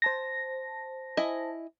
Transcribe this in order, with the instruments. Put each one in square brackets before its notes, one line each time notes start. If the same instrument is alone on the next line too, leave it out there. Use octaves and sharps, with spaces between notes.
[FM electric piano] C5 A5 A#6
[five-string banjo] E4 D#5 G#5